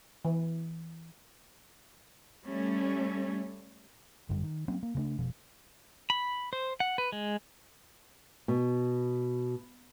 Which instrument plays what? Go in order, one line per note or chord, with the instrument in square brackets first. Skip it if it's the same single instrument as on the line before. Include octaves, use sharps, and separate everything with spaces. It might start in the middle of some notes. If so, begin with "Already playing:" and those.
[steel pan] E3
[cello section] G3 A3 C#4
[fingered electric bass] G#1 F#2 D3 G3
D#3
F#3 A#3 C4 C#4
A#3
C#3 G#3 A3 D4
F1 B2 F3
[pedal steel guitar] B5
C5
F#5
B4
G#3
[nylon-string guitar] B2